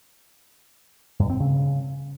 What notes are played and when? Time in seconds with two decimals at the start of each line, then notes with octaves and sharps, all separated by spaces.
1.19 G2
1.30 C4
1.40 C#3